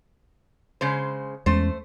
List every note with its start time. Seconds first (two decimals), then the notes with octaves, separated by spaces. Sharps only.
0.81 C#3 G#3 C5
1.46 E2 G#3 A3 C#4 C5